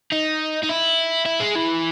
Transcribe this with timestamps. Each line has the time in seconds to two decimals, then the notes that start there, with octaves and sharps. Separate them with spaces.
0.12 D#4
0.63 D#4
0.69 E4
1.26 E4
1.40 G#3
1.55 E3